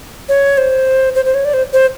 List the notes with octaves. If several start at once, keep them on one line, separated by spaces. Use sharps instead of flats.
C#5
C5
C5
C5
C#5
D5
C5
C5